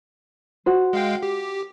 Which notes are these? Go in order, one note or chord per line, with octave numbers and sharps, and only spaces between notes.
F#4 C5
G#3 F5 G5
G4